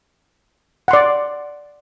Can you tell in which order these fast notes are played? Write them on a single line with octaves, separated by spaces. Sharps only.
F#5 C6 D5